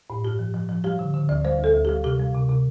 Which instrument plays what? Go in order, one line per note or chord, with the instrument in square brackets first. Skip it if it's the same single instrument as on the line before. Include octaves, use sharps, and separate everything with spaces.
[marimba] A2
G2 G4
F3
F3
F3
G3 G4
D3
D3
D2 D5
G3 C5
D2
A4
D2
G3 G4
C3 G4
G3
C3
C3